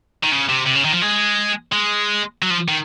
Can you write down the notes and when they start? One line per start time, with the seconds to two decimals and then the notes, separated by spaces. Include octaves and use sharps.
0.24 D#3
0.32 C#3
0.49 C3
0.67 C3
0.75 C#3
0.85 D#3
0.93 F3
1.02 G#3
1.72 G#3
2.42 F#3
2.50 F3
2.68 D#3